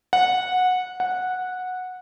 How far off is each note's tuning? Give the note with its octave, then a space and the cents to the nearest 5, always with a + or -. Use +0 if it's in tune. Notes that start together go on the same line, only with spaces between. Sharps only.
F#5 -15
F#5 -10